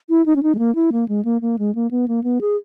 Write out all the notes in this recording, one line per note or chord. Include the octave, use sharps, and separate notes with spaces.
E4
D#4
C#4
D#4
G#3
A#3
E4
A#3
G#3
A#3
A#3
G#3
A#3
B3
A#3
B3
G#4